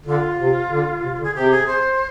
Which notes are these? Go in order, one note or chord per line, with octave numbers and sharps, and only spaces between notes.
D3 F4
C3
D3
C3
D3
G#4
C3 G4
G#4
C5